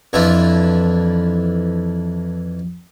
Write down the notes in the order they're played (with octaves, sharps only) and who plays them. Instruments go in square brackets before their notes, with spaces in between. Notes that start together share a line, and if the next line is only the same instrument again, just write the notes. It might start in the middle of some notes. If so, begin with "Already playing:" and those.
[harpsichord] F2 E3 D4 E4 F4